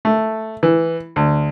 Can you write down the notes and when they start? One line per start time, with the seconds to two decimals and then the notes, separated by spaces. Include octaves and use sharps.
0.05 A3
0.63 E3
1.16 D2